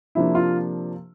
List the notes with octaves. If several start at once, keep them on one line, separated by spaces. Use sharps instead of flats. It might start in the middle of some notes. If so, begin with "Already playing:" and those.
C3 F3 A#3 D4 E4
F4